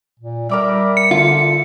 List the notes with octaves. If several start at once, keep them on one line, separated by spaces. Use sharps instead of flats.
A#2
G3 A#4 D5 E5
C#7
D3 F4